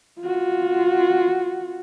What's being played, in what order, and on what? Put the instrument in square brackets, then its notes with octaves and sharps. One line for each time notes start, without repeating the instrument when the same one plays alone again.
[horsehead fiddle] F4 F#4